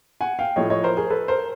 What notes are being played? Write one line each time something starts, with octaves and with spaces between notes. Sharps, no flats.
F#5 G#5
F5 G5
A2 F3 A3 C#5 D#5
C#5 D#5
A#4 C5
G#4 A#4
A4 B4
A#4 C5